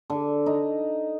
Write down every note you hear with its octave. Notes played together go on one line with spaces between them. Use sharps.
D3
D#4